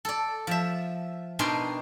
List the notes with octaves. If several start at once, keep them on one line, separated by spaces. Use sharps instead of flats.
A4 D5
F3 E5
B2 D4 D#4 A#4 G5 C6